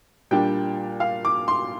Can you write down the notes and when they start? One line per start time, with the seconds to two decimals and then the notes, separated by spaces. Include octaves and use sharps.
0.31 A#2 G3 D4 G5
1.00 F5
1.25 D6
1.48 C6